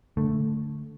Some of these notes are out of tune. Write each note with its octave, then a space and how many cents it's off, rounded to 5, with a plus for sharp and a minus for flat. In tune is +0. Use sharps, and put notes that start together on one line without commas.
D3 +0 A3 +0